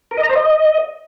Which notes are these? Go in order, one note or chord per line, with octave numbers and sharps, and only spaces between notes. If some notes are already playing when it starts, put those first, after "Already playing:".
A#4
D#5
A#5
C5
D#5